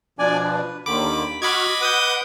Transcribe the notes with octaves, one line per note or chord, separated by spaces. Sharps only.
B2 F3 D4 D5 G#5
B4
D#2 D3 D#3 B5 D6
F#4 D#5 B5 C#6 D6 F6 G#6
B4 F#5 D6 D#6 G6